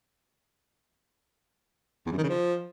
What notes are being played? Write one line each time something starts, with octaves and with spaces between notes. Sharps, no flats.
E2
F#2
D#3
C#3
F3